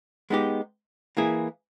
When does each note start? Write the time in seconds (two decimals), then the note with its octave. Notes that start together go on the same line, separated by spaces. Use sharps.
0.30 G#3 B3 D#4 G4
1.17 E3 A#3 E4 G#4